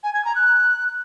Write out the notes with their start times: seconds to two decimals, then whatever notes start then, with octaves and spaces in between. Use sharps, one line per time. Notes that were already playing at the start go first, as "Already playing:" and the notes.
0.03 G#5
0.14 G#6
0.24 A#5
0.35 F#6